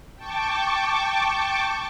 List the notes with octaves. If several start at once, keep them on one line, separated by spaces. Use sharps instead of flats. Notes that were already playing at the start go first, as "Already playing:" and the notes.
G5 A5 C#6 D6